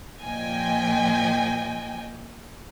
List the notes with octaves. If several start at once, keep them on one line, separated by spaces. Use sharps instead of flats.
A#2 F3 D#5 G5 G#5